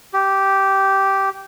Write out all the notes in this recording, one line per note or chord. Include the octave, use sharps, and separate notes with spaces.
G4